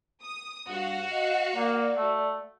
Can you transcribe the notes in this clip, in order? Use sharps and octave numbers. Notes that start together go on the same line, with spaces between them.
D#6
G2 F#4 F5
D#5
A#3 D5
A3